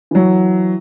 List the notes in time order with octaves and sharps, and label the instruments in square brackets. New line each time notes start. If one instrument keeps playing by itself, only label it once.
[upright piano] E3 F#3